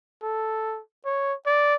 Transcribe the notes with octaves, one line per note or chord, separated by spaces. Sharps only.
A4
C#5
D5